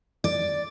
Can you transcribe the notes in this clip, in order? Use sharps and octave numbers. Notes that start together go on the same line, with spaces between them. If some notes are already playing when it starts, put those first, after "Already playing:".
D5